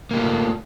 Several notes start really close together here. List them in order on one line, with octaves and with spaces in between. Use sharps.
A#3 G4 F4 A3